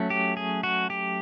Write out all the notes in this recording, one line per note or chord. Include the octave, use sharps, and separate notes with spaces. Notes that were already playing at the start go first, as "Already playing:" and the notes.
Already playing: F#3 A3 C#4
G4
G#4
F#4
G4